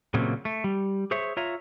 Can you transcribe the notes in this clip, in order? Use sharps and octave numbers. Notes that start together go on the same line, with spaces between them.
A#2 C#3 F#3 A3 A#3 C4
A3
G3
G#4 C5 C#5 E5
F4 C#5 E5 A#5